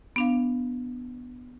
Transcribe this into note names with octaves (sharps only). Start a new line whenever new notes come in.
B3 D4 F5